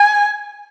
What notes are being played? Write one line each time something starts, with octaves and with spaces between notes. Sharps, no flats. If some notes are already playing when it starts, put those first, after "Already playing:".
Already playing: G#5